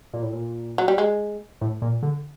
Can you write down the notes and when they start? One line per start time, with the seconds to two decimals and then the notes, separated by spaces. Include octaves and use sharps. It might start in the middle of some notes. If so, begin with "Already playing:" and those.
0.13 A#2
0.22 A2
0.33 A#2
0.78 F#3
0.88 G3
0.98 G#3
1.61 A2
1.82 A#2
2.03 D3